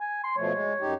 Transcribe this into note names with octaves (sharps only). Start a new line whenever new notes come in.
G#5
C6
B2 F3 A3 C#5
G#3
F#2 D#4 G4